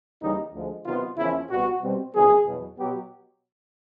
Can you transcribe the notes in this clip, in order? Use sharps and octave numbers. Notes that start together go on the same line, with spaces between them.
D#2 C#3 E3 G3 D#4
D2 D3 F3 G#3
C3 D#3 F#3 B3 F4
E2 C#3 F3 A#3 C#4 E4
C2 A#2 G3 B3 F#4
B2 G3 C4
C#2 C3 D#3 F#3 B3 G#4
E2 B2 F#3
B2 F#3 B3 G4